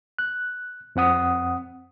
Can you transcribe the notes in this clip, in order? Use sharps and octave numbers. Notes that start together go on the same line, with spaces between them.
F#6
F2 C4 F#5 D#6